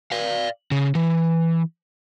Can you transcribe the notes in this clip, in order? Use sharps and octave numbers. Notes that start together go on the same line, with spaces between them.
D5 F5
C#3
E3